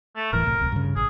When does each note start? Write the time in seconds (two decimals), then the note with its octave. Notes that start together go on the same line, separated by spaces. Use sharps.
0.16 A3
0.33 D#1 A2 E3 A#4
0.45 C2 A2
0.59 D1 C2
0.72 G2 C#3
0.96 A1 G#4